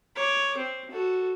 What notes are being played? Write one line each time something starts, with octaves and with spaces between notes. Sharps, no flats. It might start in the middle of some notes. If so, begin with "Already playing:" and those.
C#5 D6
C4
F#4 A4